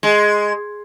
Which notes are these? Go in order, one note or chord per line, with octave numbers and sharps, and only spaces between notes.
G#3